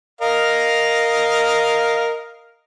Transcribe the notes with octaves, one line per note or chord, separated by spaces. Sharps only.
A#4 D#5 F5